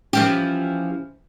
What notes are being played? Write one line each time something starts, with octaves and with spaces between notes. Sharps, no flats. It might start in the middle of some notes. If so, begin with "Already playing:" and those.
E3 F3 C#4 G4